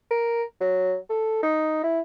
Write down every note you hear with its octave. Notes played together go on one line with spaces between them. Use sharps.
A#4
F#3
A4
D#4
E4